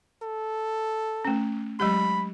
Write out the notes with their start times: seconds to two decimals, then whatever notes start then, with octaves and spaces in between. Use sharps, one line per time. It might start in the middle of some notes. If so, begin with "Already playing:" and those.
0.23 A4
1.25 A3 C#4
1.80 F#3 G#3 G4 B5